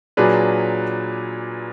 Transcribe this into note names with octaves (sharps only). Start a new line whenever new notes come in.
A#2 F#3 D4 G#4 B4